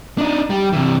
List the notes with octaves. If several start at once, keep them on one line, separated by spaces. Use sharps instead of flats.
D4 D#4
G3
C3 E3